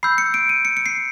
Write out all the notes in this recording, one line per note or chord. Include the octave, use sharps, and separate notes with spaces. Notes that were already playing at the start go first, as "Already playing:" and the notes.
B5 E6 G6 C7
C#7
D7
D#7
C#7
C#7
C7